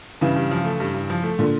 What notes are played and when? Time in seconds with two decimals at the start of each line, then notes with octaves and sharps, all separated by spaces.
0.21 G2 C#3 E3
0.36 G2
0.51 F3
0.65 A3
0.80 G2
0.94 G2
1.10 F3
1.23 A3
1.39 A#2 D3